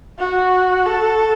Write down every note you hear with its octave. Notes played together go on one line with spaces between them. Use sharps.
F#4
A4